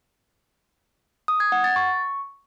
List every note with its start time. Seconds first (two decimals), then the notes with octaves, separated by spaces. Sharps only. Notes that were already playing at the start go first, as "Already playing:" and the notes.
1.28 D#6
1.40 G#6
1.52 F#5
1.64 A6
1.76 C#6